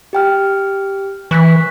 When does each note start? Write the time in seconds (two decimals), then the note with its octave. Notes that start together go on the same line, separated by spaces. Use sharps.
0.13 G4 G5 F6
1.31 E3 C#6 F#6 B6